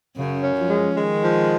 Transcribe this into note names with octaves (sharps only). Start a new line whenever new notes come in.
F#2 C#3
C#4
F3
G#3
D#3 G#3
F3